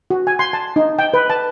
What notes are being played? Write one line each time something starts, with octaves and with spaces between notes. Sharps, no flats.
F#4
G#5
C6
A5
D#4
G5
B4
A5